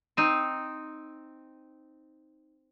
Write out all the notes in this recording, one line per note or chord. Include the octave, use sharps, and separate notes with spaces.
C4 D#4